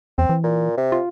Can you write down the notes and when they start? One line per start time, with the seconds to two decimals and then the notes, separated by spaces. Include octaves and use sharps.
0.18 E2 C4
0.29 E3
0.44 A#2
0.77 C3
0.92 F4